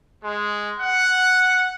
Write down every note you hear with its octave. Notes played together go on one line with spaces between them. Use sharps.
G#3
F#5